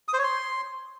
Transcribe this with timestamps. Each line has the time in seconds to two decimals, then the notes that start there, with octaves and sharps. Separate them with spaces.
0.08 D#6
0.13 C5
0.19 C#5
0.24 C6